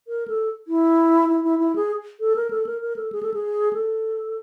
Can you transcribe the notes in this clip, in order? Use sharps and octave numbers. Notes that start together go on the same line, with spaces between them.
A#4
A4
E4
E4
E4
E4
G#4
A4
A#4
A4
A#4
A#4
A4
G#4
A4
G#4
A4